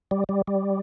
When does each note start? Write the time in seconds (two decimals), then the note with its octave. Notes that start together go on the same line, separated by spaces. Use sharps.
0.11 G3
0.29 G3
0.48 G3